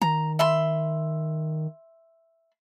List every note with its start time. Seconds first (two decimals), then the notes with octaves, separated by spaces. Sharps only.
0.02 D#3 A#5
0.39 E5 B5 C6